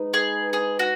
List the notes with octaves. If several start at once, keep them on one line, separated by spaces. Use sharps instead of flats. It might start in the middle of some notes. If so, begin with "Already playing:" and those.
Already playing: G#3 D#4 B4
G#4
G#4
F#4